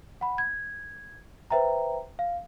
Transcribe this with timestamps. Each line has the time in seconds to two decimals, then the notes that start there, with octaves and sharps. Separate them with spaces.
0.21 F#5 B5
0.38 G#6
1.50 B4 C5 E5 G5 A#5
2.19 F5